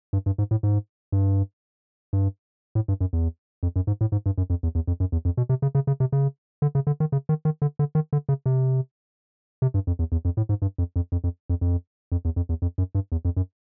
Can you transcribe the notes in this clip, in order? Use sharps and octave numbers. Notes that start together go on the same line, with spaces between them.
G2
G2
G#2
A2
G#2
G2
G2
A2
G2
F#2
E2
F2
F#2
G#2
A2
G#2
G2
F#2
F2
E2
E2
F2
F#2
E2
F2
B2
C3
C#3
C#3
C#3
C3
C#3
D3
C#3
D3
D#3
C#3
D#3
D#3
D3
D3
D#3
D3
C#3
C3
C3
G2
F2
E2
E2
F2
A2
G#2
G2
F2
F2
F2
F2
F2
F2
F2
E2
F2
E2
F2
F#2
G2
E2
F2
F#2